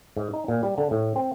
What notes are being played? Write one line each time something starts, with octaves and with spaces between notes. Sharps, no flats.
G#2
D#4
A#2
G3
D3
A2
C4